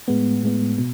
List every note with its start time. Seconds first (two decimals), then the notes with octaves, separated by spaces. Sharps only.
0.08 A2 G#3 B3
0.43 A2 G#3 B3
0.78 B2